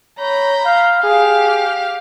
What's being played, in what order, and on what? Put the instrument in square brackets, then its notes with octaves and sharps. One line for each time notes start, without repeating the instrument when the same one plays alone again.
[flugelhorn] C#5 [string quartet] A#5 B5 G6
[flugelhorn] F5
[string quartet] G4 F5 [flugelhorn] G#4